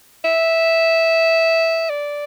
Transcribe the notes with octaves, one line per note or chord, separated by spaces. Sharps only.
E5
D5